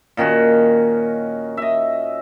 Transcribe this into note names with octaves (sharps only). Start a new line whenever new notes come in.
A#2 D#3 C#4 F#4
D#5 E5